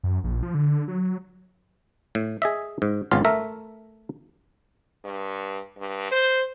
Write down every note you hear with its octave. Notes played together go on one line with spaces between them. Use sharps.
F#2
A#1
F3
D3
F#3
A2
G#4 D#5 E5
G#2
G#1 C#3 B3 F4 F5
A3 A#4 E5
G2
G2
C5